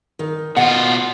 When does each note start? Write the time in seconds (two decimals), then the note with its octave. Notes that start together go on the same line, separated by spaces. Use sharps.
0.19 D#3
0.57 B2 F4 F#5